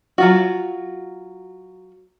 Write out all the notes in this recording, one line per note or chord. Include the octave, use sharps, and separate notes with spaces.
F#3 F4 F#4